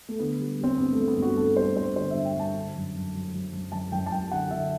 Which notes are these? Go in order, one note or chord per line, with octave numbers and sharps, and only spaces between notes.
A3
D3 B3
G3
G3 C4
G2 B3
A3
G2
B3
G2
F#4
G2 A4
G3 C5
G2 C5
D3 C5
G2 E5
G5
G2 A5
D3
F#2
F#2
F#3
F#3
F#2
F#2 A5
F#2 G5
A5
F#2 G5
D3 F#5
D3 E5